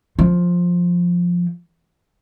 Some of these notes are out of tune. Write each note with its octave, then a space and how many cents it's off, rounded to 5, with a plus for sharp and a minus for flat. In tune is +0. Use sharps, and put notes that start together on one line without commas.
F3 +10